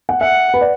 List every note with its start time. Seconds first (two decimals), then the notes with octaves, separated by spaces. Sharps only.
0.09 F#5
0.21 E5 F#5
0.54 B4
0.61 D5